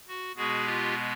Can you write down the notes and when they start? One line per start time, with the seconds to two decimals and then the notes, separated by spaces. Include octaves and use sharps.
0.08 F#4
0.36 B2 G#3 B3 F#4 G#4
0.65 F4 G4